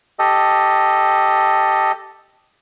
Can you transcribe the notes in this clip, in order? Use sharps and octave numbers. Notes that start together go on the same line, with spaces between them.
G4 A4 D#5